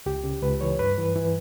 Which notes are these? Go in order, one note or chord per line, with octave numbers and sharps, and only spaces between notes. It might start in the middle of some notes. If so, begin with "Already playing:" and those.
C#2 G4
C#3
C#2 B4
E3 C#5
G2 B4
E3
E3